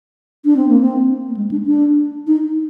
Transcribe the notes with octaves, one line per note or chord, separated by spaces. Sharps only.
D4
C4
A#3
C4
A#3
G#3
D4
D4
D#4